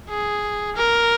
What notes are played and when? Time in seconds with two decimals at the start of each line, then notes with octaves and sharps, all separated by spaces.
0.09 G#4
0.76 A#4